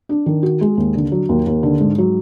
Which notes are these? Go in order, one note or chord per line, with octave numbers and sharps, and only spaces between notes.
D4
D#3
F#4
G#3
D#2
D3
F#3
D#2
D#2
D3
G#2
F#3